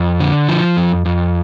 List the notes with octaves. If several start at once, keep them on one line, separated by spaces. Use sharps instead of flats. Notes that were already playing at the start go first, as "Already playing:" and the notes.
Already playing: F2
D3
F3
F2
F2